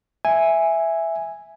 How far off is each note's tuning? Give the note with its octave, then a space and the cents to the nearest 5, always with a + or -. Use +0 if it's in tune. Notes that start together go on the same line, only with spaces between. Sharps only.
E5 +0 G#5 -5